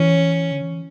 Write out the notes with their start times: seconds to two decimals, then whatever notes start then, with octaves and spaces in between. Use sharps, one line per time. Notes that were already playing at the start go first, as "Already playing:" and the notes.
Already playing: E3 C#4
0.52 D3
0.61 E3